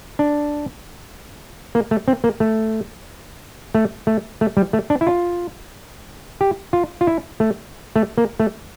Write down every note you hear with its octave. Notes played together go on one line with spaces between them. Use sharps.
D4
A#3
A3
C4
A#3
A3
A3
A3
A3
G3
A3
D4
E4
F4
G4
F4
F4
E4
A3
A3
A#3
A3